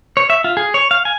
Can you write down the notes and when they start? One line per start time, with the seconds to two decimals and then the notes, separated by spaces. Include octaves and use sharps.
0.17 C#5
0.30 E5
0.44 F4
0.57 G#4
0.74 C#5
0.91 F5
1.05 G#5